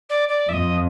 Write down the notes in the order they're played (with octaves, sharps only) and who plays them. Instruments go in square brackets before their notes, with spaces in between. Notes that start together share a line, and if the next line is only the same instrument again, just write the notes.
[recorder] D5
D5
[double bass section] F2 [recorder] D#5 E5